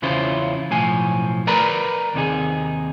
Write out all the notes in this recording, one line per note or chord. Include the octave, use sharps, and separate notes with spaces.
E2 C#3 C#4 E4 F4 C5
B1 A2 F3 G#5
A#4 B4 D5 A#5 B5
D#2 C3 D#4 G#4